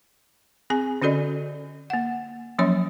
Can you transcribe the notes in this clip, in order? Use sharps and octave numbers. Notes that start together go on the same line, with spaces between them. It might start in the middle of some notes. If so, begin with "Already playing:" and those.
C4 G#4 G#5
D3 C#4 F#4 A4 D5 D#5
A#3 F#5
F3 F#3 A#3 C#4 C#5 C6